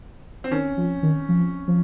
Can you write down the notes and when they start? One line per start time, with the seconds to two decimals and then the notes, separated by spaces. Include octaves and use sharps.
0.44 C4
0.51 D#3 C#4
0.77 F3
1.03 D#3
1.29 F3
1.68 F3